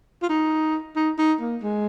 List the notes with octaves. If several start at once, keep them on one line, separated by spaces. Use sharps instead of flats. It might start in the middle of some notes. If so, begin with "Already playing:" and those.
F4
D#4
D#4
D#4
A#3
G#3